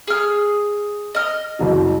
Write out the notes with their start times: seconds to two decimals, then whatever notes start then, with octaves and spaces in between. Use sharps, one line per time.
0.07 G#4 F6
1.15 D#5 F6
1.59 F#1 C2 F#3